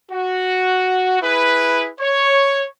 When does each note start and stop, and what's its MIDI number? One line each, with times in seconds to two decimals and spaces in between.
0.11 1.20 66
1.21 1.89 64
1.21 1.89 68
1.21 1.89 71
2.00 2.66 73